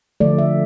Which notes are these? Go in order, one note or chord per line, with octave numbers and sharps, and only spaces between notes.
D3 F3 A3 D5
E5